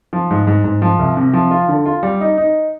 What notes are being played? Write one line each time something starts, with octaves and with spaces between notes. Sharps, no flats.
F3
G#2
G#2
G#2
F3
C2
C3
F3
F4
D3
F4
G3
D#4
D#4